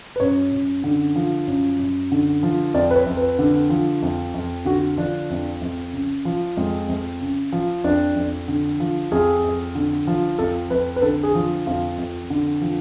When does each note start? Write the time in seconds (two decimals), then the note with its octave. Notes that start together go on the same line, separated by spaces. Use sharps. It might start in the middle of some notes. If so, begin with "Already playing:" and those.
0.16 B4
0.20 F#2 C#5
0.52 F#2
0.84 D3
1.16 F3
1.47 F#2
1.79 F#2
2.12 D3
2.43 F3
2.74 F2 D5
2.91 B4
2.96 C#5
3.06 F2
3.17 B4
3.39 D3
3.70 F3
4.02 F2
4.34 F2
4.65 D3 F#4
4.98 F3 D4
5.30 F2
5.61 F2
5.93 C#3
6.25 F3
6.57 F2 G#3
6.88 F2
7.21 C#3
7.52 F3
7.84 F2 D4
8.16 F2
8.48 D3
8.80 F3
9.12 F2 G#4
9.44 F2
9.75 D3
10.07 F3
10.39 F2 A4
10.70 F2 B4
10.96 B4
11.02 D3 A4
11.23 G#4
11.35 F3
11.67 F2 F4
11.98 F2
12.30 D3
12.62 F3